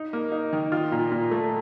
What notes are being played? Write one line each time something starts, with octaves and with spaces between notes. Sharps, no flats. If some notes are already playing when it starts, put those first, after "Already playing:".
Already playing: D#4
A#3
D#4
D#3
F4
A#2
A#2
A3